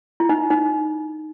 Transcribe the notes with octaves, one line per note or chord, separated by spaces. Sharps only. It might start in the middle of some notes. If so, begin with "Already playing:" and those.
E4
D#4
D#4